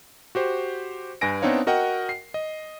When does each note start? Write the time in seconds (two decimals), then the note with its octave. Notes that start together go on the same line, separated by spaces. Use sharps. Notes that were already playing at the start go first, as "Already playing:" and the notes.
0.35 F#4 G4 C5
1.21 G2 B4 G#5 A#6 D7
1.42 B3 C4 D4 D#4 C#5 F5
1.67 F#4 A#4 D#5 F#5 G5
2.09 C7
2.34 D#5